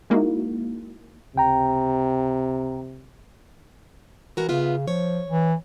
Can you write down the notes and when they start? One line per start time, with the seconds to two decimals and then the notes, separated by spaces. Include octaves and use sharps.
0.10 G#3 A#3 D#4 E4 F#4
1.36 C#2 C3 G5 A#5
4.37 E3 F#4 A#4
4.49 C#3 B3 F4 E5
4.88 F3 C#5
5.28 E3